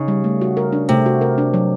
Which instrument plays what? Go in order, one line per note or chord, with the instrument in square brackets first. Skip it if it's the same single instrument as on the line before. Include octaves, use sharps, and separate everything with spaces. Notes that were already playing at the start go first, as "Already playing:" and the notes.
Already playing: [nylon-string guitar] C#3 [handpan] D#4
[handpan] G3
A3
F#4
A#4
D4
[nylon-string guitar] C3 [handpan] A3
[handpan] F#4
A#4
D4
F#3